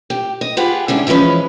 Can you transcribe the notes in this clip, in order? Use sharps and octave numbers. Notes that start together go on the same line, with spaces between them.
G4
D#5
F4 G4 G#4 B4 F#5
D3 G3 G#3 C#4 D4 E4
E3 F3 G#3 C#4 B4